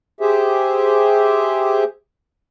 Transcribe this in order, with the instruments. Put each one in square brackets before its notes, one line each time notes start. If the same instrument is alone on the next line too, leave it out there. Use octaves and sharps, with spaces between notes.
[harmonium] G4 G#4 C5 E5